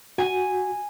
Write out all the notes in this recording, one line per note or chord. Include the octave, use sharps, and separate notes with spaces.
F#4 G#5